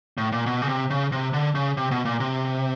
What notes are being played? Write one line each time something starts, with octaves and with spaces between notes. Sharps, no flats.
A2
A#2
B2
C#3
C3
C#3
C3
D3
C#3
C3
B2
A#2
C3